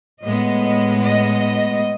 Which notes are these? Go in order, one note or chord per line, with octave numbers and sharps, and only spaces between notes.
A2 G#3 B3 D#5
D#5